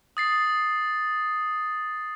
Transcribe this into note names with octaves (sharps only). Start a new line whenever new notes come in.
D#6 A6 C7